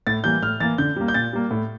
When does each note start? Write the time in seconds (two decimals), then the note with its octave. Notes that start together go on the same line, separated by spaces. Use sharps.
0.07 A2 A6
0.24 E3 G3 A#3 G6
0.42 A2 F6
0.60 E3 A#3 A6
0.78 D3 G6
0.96 G3 A#3
1.08 G6
1.14 A#2 A6
1.33 G3 A#3
1.51 A2